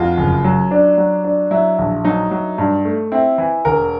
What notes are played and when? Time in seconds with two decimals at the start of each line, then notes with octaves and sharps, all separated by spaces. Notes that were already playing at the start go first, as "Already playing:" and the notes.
Already playing: F2 F4 F#4
0.17 F#1
0.45 F#3
0.71 D4
0.97 F#3
1.24 D4
1.51 F#3 E4
1.78 A#1
2.05 F#3 D#4
2.31 F#3
2.58 G2
2.85 A3
3.12 C4 E4
3.38 E3
3.65 E1 A#4